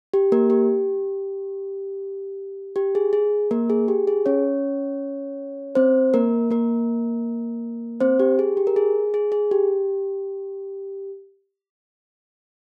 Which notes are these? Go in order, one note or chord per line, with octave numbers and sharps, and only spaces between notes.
G4
A#3 A#4
G4
G4
G#4
G#4
A#3 A#4
G#4
G4
G#4
C#4 C#5
C4 C5
A#3 A#4
A#3 A#4
C4 C5
G4
G#4
G4
A#4
G#4
G#4
G#4
G4